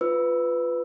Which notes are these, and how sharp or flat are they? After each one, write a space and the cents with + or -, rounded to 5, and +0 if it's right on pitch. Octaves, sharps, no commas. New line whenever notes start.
F4 -5 B4 +10 E6 +0